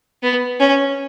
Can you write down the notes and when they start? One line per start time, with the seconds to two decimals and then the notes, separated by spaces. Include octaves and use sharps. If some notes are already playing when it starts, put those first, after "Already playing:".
0.23 B3
0.60 C#4